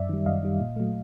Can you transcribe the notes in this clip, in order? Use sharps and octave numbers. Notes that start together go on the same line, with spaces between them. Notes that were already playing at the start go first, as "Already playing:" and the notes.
Already playing: F#2 D5 E5
D#3 G3
F#2 D#5 F5
D#3 G3
A#2
F#3 A3